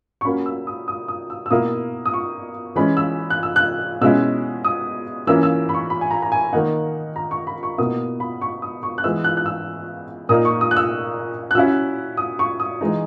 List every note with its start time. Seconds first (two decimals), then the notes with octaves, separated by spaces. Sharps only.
0.21 C#6
0.25 F#3 A#3 C#4 B5
0.46 E6
0.67 D#6
0.88 D#6
1.08 D#6
1.30 E6
1.46 E6
1.50 B2 A#3 E4 D#6
2.06 D#6
2.14 C#6
2.76 E3 G#3 C#4 B5
2.97 E6
3.30 F#6
3.43 E6
3.56 F#6
4.01 B2 G#3 C#4 E4 E6
4.65 D#6
5.27 E3 A#3 C#4 E4 E6
5.43 E6
5.69 B5
5.74 C#6
5.90 B5
6.01 G#5
6.11 A#5
6.23 A#5
6.32 G#5
6.53 D#3 A#3 D#4 F#5
7.16 A#5
7.31 C#6
7.47 B5
7.63 C#6
7.78 B2 A#3 E4 D#6
8.20 B5
8.41 C#6
8.62 D#6
8.83 C#6
8.98 F#6
9.04 E3 G#3 B3 E4 E6
9.24 F#6
9.37 F#6
9.46 E6
10.29 A#2 A#3 D#4 D#6
10.45 C#6
10.61 D#6
10.71 F#6
10.77 E6
11.51 F#6
11.55 F#3 C#4 E4 E6
12.17 D#6
12.39 C#6
12.60 D#6
12.81 E3 G#3 D#4